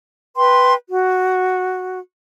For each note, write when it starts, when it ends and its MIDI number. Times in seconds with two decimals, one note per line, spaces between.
0.35 0.74 71
0.35 0.74 79
0.35 0.74 84
0.87 1.98 66